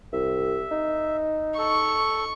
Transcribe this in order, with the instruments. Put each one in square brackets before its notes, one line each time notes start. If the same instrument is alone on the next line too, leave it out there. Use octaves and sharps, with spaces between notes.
[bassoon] C2 [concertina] E5
[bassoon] D#4
[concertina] A4 [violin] C#6